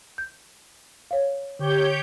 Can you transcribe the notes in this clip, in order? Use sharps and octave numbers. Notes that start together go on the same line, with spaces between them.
G6
C#5 F5
D3 G4 C#5 G6